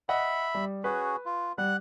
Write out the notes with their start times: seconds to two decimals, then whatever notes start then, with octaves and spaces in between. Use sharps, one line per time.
0.09 D#5 E5 F#5 B5
0.55 G3
0.84 C#4 F#4 G#4 B4
1.26 F4
1.58 G3 F#5 F#6